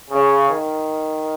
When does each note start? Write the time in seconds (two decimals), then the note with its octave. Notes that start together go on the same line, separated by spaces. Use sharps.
0.11 C#3
0.48 D#3